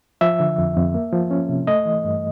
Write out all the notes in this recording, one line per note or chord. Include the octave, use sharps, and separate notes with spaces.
F3 E5
D3
F2
F2
A#3
F3
C#4
C3
A3 D#5
E3
G2